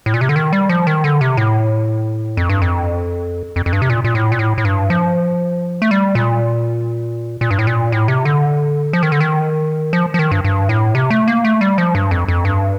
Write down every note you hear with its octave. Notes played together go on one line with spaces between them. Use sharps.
A2
A#2
C3
D3
D#3
G3
F3
D#3
D3
C3
A2
F2
G2
F2
F2
F2
G2
C3
A#2
A#2
A2
A#2
A2
A2
G2
F3
A3
G3
A#2
A#2
G2
A2
A#2
A2
C3
D3
F3
D#3
D3
D#3
F3
F3
D#3
G2
G2
A2
C3
A3
A#3
A3
G3
F3
G2
F2
F2
G2